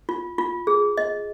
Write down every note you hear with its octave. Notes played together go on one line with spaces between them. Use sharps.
F4
F4
G#4
D#5